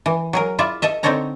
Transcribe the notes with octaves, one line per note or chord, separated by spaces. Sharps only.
E3
F#3 G#4 A#4
E4 F4 D5 E5
A4 D#5 E5
D3 C4 D#4 A4 C#5 A#5